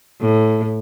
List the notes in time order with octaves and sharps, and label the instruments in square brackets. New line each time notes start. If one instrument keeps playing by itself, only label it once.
[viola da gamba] A2